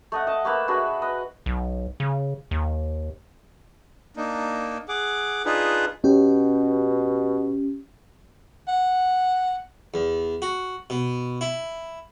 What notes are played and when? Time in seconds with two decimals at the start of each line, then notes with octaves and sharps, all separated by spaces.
0.12 A3 D#5 F#5
0.27 D#5 A5
0.45 A3 A#3 B4 E5
0.68 D4 F#4 G#4 B4
1.02 B4 D#5
1.46 B1
2.00 C#3
2.51 D#2
4.17 A#3 D4 D#4
4.88 G#4 F#5 D6
5.45 D4 D#4 F4 G#4 B4
6.04 B2 C#4 G4
8.68 F#5
9.94 E2
10.42 F#4
10.90 B2
11.41 E4